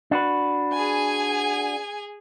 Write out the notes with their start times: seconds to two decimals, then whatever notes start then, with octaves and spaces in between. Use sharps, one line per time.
0.11 D4 F#4 B4
0.73 G#4 G#5